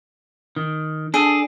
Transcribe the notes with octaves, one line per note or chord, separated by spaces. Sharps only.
D#3
D4 G#4 A4